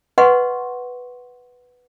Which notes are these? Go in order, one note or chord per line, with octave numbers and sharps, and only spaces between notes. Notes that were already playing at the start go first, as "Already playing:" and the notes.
B4 D#5 F#5 C6 C#6